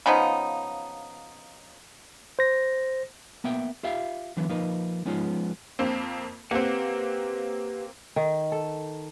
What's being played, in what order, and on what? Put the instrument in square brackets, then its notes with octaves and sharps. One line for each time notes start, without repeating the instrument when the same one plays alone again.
[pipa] C#3 F3 B3 D#4
[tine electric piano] C5 A#6
[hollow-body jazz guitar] A#3 B3 E5 G5
F4 G4 E5 F5
D3 E3 F#3 B3
F3 A#3 D#4 B4
F3 G#3 B3 C#4 D#4 F4
[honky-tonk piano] F2 A#3 C4
[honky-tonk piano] A#3 C4 [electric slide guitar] G4 B4 F#5
[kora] D#3
A4